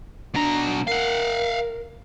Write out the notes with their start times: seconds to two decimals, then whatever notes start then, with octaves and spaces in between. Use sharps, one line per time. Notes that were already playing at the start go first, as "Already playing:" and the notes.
0.35 B2 D4 A#5
0.87 A#4 F5 F#5